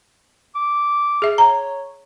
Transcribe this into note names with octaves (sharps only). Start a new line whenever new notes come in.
D6
G#4 E5
C#5 A#5